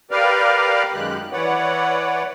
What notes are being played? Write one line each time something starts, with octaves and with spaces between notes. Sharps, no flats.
G4 A#4 B4 D5 F5
F#2 D#3 G#3 G4 F#6
E3 B4 C#5 D5 F#5